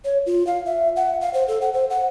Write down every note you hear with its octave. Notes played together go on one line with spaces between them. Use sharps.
C#5
F4
F5
E5
F#5
F5
C5
A4
F#5
C5
F#5